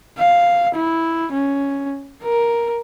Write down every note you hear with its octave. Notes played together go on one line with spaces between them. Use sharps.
F5
E4
C#4
A#4